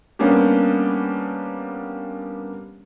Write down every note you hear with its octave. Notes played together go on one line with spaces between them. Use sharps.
G3 A#3 B3 C#4 D4 G4